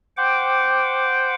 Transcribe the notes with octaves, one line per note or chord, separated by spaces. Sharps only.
C5 F#5 G5 D6